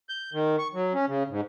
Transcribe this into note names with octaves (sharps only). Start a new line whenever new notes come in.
G6
D#3
C#6
F#3
C#4
C#3
G#2